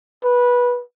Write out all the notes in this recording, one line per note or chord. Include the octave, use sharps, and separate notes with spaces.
B4